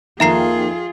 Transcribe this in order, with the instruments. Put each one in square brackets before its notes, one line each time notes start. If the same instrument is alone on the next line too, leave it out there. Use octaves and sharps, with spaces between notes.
[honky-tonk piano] F2 D#3 [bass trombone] A#3 [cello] F4 G#4 [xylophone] E5 A#5 C7